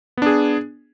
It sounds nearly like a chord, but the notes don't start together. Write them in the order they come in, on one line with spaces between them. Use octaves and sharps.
B3 D4 G#4